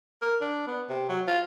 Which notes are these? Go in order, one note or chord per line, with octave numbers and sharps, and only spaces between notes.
A#4
D4
B3
C3
F#3
F4